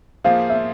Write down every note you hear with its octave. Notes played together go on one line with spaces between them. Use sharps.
F3 A#3 F4 G#4 C5 F5
E5